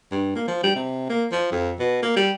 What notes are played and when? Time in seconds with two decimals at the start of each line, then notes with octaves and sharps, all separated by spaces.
0.12 G2
0.36 A#3
0.48 F3
0.63 G3
0.76 C3
1.09 A#3
1.32 F3
1.52 F2
1.79 B2
2.03 A#3
2.16 G3